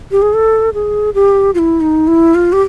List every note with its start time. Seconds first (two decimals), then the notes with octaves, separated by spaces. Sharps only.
0.11 G4
0.22 G#4
0.34 A4
0.74 G#4
1.15 G4
1.54 F4
1.59 E4
1.81 D#4
2.08 E4
2.35 F4
2.53 G4